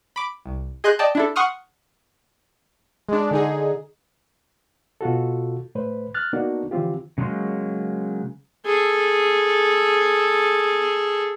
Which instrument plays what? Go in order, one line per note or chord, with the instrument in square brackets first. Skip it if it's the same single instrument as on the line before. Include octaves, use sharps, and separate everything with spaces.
[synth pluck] B5 D6
C2
G#4 D#5 C6 F#6 G6
D5 D#5 G5 A5
D4 E4 A4
F#5 C6 C#6 D#6 F6
[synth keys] G#3 D4
D3 D#4 G#4
[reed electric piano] B2 F4 F#4 A4
A2 A3 B4 C5
F6 F#6 A6
A#3 B3 D4 D#4 F#4 A#4
D3 E3 F3 C4 F4 G4
[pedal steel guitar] C#3 F#3 G#3 A#3 C6
[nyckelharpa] G#4 A4